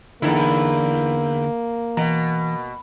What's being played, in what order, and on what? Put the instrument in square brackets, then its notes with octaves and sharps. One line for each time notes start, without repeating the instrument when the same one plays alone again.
[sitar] E2 E4 [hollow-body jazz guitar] D3 D#4 [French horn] A#3
[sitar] B2 [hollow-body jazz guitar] E3 A#5